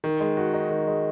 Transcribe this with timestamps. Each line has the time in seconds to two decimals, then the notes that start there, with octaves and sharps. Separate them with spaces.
0.04 D#3
0.20 G#3
0.37 F#4
0.54 D#4
0.70 D#3
0.87 G#3